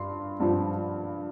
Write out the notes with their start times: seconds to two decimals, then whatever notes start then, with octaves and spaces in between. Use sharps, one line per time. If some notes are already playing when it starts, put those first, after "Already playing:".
Already playing: G2 C6
0.40 G2 F3